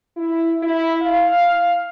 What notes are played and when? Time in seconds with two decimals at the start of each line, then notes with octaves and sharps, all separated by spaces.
0.17 E4
0.63 E4
1.02 F5